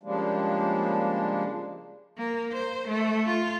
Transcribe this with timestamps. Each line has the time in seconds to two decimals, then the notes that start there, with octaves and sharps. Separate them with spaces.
0.03 C#3 F3 G3 G#3 A#3 D4
2.18 A#3
2.52 C5
2.88 A3
3.26 F4